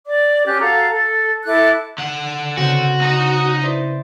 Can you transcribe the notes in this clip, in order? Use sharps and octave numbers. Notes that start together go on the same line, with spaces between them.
D5 D6
C#4 G4 F#6
F#4 A4 F5 A#5
A4
E4 A4 D6 F#6
D3 F#5
C#3 C4 F#4 G6
D#4 D#5
E4 C5 D5